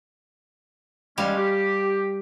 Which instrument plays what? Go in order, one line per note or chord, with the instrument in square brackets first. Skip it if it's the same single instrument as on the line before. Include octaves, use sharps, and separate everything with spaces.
[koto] G3 F5 [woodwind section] G#3 C#4
[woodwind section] G4